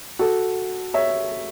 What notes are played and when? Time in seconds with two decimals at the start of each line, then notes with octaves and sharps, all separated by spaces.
0.19 F#4 A4
0.94 C#5 E5